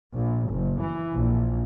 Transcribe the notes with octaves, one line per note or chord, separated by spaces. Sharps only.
A#1
F#1
E3
A#1